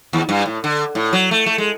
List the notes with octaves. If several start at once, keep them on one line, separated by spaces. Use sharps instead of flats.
D#2
G2
A2
D3
A2
F#3
A3
A3
G#3